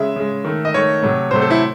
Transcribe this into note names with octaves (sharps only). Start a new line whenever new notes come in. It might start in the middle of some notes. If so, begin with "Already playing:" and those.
Already playing: C#3 G#3 E5
C#3 G#3
D#3 A3
D#5
D#3 A3 C#5
C3 F#3 A3
C3 F#3 A3 C5
A4
E4